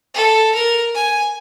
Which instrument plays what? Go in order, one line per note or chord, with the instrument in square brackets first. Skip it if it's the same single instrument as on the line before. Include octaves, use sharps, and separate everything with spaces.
[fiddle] A4
A#4
G#5